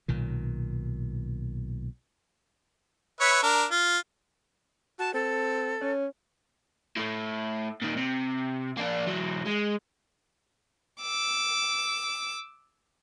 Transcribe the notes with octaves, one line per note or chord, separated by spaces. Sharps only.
B1 A#2 D#3
B4 C#5 E5
D4 A#4
F4
F#4 A5
C4 A4
C#4 C#5
A2 A3
A#2 D#3
C3
A#3 D4
E3 F#3
G#3
D6 E6